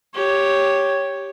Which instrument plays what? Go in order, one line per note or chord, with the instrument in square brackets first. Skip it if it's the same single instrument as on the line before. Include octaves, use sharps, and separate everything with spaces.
[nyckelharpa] G4 C#5